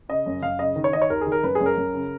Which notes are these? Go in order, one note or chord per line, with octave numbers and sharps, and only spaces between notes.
C#3 D#5
F#2
F#2 F5
C#3 D#5
D#3
C#5
D#3 D#5
C#5
D#2 A#4
D#3 G#4
A#4
F#2 B4
G#4
F#2
A#4
F#2
C#3